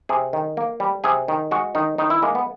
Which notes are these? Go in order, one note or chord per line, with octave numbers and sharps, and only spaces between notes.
C3 G#4
D#3
A#3
G3
C3 G#4
D#3
G#3 F#4
D#3 D#4
D#3 D#4
E4
G#3 A#3
B3